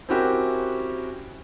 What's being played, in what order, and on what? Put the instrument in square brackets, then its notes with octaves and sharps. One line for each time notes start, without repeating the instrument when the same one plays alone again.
[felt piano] C4 C#4 E4 F#4 G4 A#4